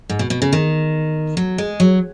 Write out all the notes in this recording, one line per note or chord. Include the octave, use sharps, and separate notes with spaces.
G#2
B2
B2
C#3
D#3
F#3
G#3
F#3